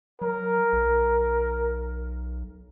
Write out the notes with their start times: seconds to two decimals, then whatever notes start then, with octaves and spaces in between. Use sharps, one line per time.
0.21 F#3 A#4
0.73 B1